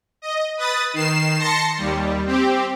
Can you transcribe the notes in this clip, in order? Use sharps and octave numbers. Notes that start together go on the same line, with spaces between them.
D#5
B4 D#6 A6
D#3 C7 E7
A5 C6 A#6 C#7
D#2 G3
C4 G4